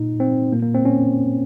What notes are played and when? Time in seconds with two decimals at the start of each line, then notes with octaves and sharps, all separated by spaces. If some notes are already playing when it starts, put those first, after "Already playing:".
Already playing: A#2 D#4
0.20 C4
0.52 A#2 A#3
0.62 A#3
0.74 C4
0.85 C#4